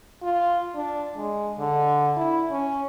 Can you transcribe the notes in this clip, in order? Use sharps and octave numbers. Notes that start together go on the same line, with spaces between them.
F4
D4
G#3
D3
E4
C#4